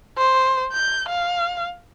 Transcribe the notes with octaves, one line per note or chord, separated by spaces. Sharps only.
C5
G6
F5